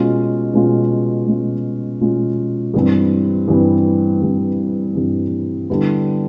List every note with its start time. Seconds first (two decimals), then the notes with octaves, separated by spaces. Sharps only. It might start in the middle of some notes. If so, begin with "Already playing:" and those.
Already playing: B2 G#3 C#4 F4
0.54 B2 G#3 C#4 F4
1.27 B2 G#3 C#4 F4
2.01 B2 G#3 C#4 F4
2.74 G2 E3 G3 C4
3.48 G2 E3 G3 C4
4.22 G2 E3 G3 C4
4.95 G2 E3 G3 C4
5.70 D3 G3 B3 E4